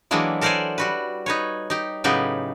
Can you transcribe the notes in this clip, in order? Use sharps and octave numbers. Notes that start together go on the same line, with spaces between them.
E3 F#3 G#3 A#3 D4 E4
A4 A#4 C5 D5 F#5 G#5
G3 F#4 B4
D#4 B4 C#5
D#4 G4
A2 C#3 F#3 B3 D#4 G4